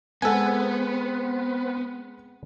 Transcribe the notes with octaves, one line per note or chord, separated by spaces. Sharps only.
G#3 B3 C4 A4 B4 F#5 G#5